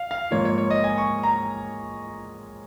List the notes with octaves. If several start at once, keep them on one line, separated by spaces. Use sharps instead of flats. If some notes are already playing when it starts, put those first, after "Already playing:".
Already playing: F5
F5
G#2 F3 A#3 F4 C#5
C#5
C#5
D#5
G#5
C#6
A#5